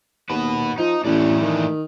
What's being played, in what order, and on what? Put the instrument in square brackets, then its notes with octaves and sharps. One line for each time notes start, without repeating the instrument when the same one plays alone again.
[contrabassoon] D#2 [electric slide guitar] F#4 B4
[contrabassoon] F3 [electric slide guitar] D#4
[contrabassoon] A1 [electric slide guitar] E3 A3 D4
[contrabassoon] D#3